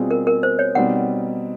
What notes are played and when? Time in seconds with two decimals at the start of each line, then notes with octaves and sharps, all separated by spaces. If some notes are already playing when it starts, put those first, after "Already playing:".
Already playing: B2 G3 C4 F4 G#4
0.11 A#4
0.27 A#4
0.43 C5
0.59 C#5
0.75 B2 G3 C4 D#4 F#5